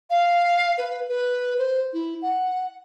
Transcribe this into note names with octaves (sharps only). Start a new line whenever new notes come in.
F5
B4
B4
C5
E4
F#5